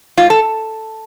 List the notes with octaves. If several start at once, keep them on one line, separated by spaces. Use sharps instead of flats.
G#2 F4
A4